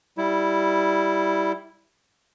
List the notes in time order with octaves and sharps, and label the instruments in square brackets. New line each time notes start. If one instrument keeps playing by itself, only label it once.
[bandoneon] G3 E4